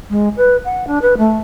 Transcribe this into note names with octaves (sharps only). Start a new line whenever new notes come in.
G#3
B4
F#5
D4
B4
A3